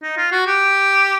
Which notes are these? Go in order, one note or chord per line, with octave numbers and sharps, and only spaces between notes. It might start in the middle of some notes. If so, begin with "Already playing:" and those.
D#4
F4
F#4
G4